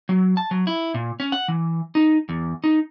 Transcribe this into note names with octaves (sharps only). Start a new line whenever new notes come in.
F#3
A5
F#3
E4
A#2
C#4
F#5
E3
D#4
E2
D#4